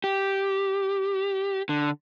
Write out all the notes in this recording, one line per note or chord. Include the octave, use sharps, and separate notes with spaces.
G4
D3